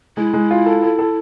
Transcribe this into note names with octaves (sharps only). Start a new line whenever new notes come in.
G#3 E4
G#3
F4
A4
A4
A4